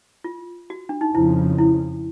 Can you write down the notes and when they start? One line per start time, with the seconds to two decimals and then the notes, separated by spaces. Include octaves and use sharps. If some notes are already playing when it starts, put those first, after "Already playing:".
0.24 F4
0.70 F#4
0.89 D4
1.01 D#4
1.14 F2 C#3 F3 E4
1.58 E4